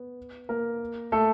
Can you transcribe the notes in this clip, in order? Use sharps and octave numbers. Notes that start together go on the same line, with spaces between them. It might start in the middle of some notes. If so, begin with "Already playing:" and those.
Already playing: B3
A#3 A#4
A3 A4